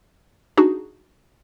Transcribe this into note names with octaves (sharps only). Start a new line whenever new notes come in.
D4 D#4 F#4 G#4